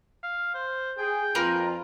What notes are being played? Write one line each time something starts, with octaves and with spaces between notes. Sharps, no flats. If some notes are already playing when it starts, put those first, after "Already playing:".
F5
C5
G#4 G5
F2 A#3 F4 A#4 B4